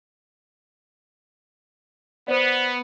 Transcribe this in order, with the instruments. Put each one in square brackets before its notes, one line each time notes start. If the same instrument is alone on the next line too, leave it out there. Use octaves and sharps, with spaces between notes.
[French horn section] B3 [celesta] C5 D5